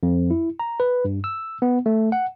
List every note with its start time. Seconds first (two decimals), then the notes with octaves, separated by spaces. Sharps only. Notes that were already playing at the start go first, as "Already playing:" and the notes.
0.03 F2
0.30 E4
0.59 A#5
0.80 B4
1.05 G2
1.24 E6
1.62 B3
1.86 A3
2.12 F#5